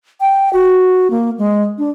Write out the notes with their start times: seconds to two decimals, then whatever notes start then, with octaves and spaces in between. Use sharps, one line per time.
0.21 G5
0.53 F#4
1.11 A#3
1.38 G#3
1.78 D4